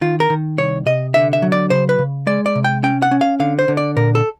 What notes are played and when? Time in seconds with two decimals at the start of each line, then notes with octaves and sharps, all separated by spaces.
0.01 D#3 F4
0.20 A#4
0.30 D#3
0.58 C2 C#5
0.86 C3 D#5
1.14 D3 E5
1.33 E5
1.42 F#3
1.52 D5
1.70 C#3 C5
1.89 B4
1.99 C#3
2.27 G#3 D5
2.46 D5
2.55 C3
2.64 G5
2.83 C#4 G5
3.02 F#5
3.11 C#4
3.21 F5
3.40 D3 F5
3.59 C5
3.68 D3
3.77 D5
3.96 A#2 A#4
4.15 A4